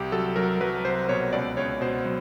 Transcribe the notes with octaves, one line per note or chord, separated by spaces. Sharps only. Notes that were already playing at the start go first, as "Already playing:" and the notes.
Already playing: C2 G4
F#3 A4
F#3 A#4
F#3 B4
C2 C5
B2 C#5
C#2 D5
C#2 C#5
B2 C5
F#3